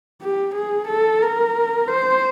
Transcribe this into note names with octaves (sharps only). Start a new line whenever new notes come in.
G4
G#4
A4
A#4
C5